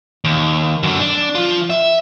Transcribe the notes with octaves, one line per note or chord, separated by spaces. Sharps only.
D#2
F#2 D3
D4
F3 F4
E5